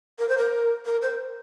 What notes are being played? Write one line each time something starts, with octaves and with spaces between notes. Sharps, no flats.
A#4
C5
A#4
A#4
C5